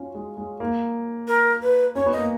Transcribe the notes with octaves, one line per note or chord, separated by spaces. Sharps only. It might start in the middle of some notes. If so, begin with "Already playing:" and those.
Already playing: C#4 F4 F#4
G#3
G#3
A#3
A#4
B4
C#4 C#5
B3
A#3 D#5